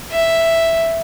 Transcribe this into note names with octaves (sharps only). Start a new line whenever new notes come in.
E5